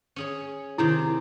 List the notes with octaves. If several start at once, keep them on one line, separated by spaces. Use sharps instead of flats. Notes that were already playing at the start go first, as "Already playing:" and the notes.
C#4 G#4 C#5
C3 D#3 E4 G#4